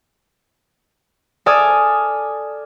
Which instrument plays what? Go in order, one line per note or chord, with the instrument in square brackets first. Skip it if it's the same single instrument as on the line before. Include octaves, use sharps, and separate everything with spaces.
[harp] A4 D5 G#5 D#6 F6